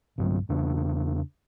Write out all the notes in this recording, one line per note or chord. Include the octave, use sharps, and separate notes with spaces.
B1 G2 F#3
E2 C#3 D4